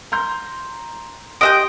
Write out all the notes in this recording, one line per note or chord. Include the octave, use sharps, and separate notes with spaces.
A#5 C6 G6
G4 D#5 E5 G5 C6 F#6 D7